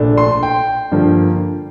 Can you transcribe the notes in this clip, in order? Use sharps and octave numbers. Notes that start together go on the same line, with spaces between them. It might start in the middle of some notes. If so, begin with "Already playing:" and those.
Already playing: A#1 A#2 A3 D4
C6
G5
G2 D3 F3 A#3